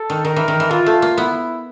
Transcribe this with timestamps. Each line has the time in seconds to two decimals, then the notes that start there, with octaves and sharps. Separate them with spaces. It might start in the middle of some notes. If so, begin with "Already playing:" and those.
Already playing: A4
0.10 D#3
0.25 D#3 A#4
0.36 E3
0.48 D#3
0.60 E3
0.71 E3 F4
0.86 A3
1.02 A#3
1.17 B3 E4